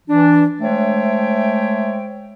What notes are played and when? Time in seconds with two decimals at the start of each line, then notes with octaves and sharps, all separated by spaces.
0.08 E3 D4
0.61 G#3 A3 C5 C#5 E5 G5